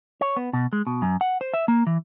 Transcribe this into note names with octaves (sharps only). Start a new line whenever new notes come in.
C#5
B3
B2
G#3
B2
F#2
F#5
C5
E5
A#3
E3